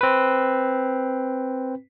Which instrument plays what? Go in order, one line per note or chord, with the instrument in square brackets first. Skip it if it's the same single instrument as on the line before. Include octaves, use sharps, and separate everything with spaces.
[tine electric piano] C4 B4